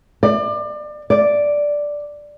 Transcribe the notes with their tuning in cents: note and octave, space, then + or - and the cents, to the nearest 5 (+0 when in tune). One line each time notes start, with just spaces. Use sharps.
D5 +30
D5 +0